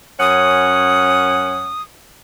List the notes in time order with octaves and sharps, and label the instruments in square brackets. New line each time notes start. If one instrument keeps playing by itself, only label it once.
[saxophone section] F#2 C#4 F#5 [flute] D#6